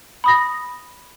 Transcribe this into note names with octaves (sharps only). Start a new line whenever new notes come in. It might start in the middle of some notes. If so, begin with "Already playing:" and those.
B5 D#6 A#6